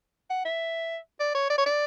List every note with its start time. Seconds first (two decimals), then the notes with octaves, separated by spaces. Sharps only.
0.30 F#5
0.45 E5
1.20 D5
1.35 C#5
1.50 D5
1.58 C#5
1.66 D5